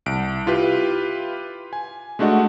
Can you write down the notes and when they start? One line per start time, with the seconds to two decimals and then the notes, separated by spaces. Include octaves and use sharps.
0.06 C2 D7
0.46 E4 F4 G4 B4
1.73 G#5
2.19 G#3 A3 D4 F#4 D#5 F#5